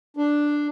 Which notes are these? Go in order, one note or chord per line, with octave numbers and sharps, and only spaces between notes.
D4